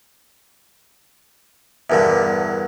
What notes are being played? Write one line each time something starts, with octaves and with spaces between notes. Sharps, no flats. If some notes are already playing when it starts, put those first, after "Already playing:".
E2 G2 D3 A#4 E5